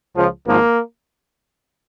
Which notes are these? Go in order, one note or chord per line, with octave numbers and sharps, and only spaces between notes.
C#2 C#3 F3
G#1 G#2 F3 A#3